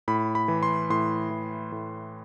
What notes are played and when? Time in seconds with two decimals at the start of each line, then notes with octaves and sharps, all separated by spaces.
0.08 A2 B5
0.35 B5
0.48 E3
0.63 C6
0.90 A2 C6
1.31 E3
1.72 A2